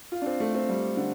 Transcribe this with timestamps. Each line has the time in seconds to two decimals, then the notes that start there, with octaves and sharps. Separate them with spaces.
0.12 F4
0.22 D4
0.26 C4
0.40 A3
0.54 C4
0.69 G3
0.97 D3